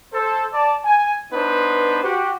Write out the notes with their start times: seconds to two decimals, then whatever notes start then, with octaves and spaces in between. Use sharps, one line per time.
0.14 A4 C5
0.53 D5 A5
0.84 G#5
1.33 B3 D4 D#4 B4 C5
2.03 F#4 G4